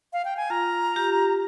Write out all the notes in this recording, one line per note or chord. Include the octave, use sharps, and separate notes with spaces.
F5
G5
G#5
F4 A#5
G4